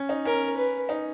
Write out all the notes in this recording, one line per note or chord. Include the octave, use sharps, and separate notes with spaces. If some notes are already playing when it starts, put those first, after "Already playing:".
Already playing: C#4
D#4
C#4 A#4
B4
D#4